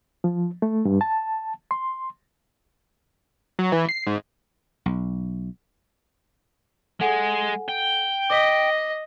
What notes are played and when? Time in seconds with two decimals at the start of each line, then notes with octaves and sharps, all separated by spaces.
0.24 F3
0.62 A3
0.85 G2
1.01 A5
1.71 C6
3.59 F#3
3.72 E3
3.89 C7
4.07 G#2
4.86 B1
7.01 G#3 A4 F#5 G#5
7.69 G5
8.30 D#5 D6 B6